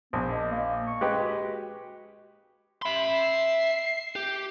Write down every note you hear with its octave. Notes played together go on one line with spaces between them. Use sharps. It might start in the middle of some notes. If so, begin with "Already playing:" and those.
A#1 B3
D#5
A#3
C#6
G#3 G4 B4
F#4
E5 B5 C6
C7
G4